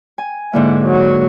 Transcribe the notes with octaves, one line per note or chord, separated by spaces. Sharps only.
G#5
G#2 D3 A#3 E4
F#3